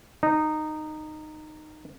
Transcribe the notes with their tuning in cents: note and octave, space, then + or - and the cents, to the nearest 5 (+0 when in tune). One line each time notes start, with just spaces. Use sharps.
D#4 -15